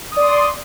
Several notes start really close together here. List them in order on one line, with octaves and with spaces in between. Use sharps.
D#6 D5 C6